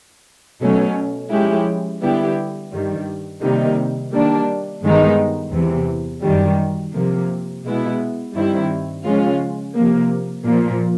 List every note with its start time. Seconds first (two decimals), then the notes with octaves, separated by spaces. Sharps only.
0.62 B2 F#3 A3 C#4
1.31 F3 G#3 C#4 E4 G4
2.02 D3 G3 B3 E4 G4
2.73 G2 D#3 G3
3.42 C3 D#3 G3 A#3 D#4
4.13 D#3 G3 A#3 D4
4.83 G2 D#3 G#3 B3 D#4
5.53 E2 C3 E3
6.23 F#2 D#3 G3
6.94 C3 F3 A#3
7.65 B2 G#3 B3 E4
8.35 G2 D#3 G3 C4 E4
9.05 C#3 F3 G#3 C#4 F4
9.75 C3 F3 A#3
10.45 A#2 F3 A#3